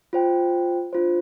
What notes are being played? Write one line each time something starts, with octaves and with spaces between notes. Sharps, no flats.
F4 C5 G5
D4 F4 C5